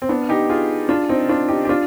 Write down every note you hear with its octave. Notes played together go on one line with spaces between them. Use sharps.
C4
B3 D4
D#4 G4
F4 G#4
D4 F4
C4 D#4
D4 F4
D#4 G4
G4
D4 F4